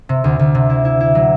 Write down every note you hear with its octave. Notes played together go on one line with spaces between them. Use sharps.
C3
D2
D2
C3
E4
E4
E4
F#3